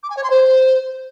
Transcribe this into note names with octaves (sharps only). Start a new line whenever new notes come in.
D6
G#5
C#5
C6
C5